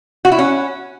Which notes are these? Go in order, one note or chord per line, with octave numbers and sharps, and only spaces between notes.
F#4
E4
C#4